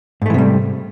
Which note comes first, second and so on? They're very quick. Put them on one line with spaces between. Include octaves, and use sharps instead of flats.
G#2 A3 E3 C3 G3